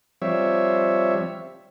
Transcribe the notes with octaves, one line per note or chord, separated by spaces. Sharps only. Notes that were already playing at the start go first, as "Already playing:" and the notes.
F3 G3 C4 C#5 E5